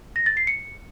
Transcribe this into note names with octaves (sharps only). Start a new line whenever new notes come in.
A#6
A6
C7
C#7